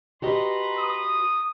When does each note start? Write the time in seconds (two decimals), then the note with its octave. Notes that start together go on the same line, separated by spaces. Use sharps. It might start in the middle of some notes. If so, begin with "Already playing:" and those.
0.22 F#4 G4 B4 D#5 A#5 C6
0.77 D#6